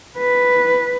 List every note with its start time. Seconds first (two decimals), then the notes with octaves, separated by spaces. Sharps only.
0.18 B4